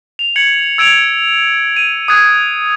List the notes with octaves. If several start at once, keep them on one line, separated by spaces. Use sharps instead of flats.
F7
G#6 C#7 F#7
E6 G#6 D7 E7 F7
D#7
D#6 F#6 G#6 D#7